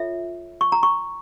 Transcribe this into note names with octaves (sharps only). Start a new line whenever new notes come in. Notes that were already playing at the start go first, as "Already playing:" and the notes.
Already playing: F4 A4 C#5 E5
C#6
A#5
C#6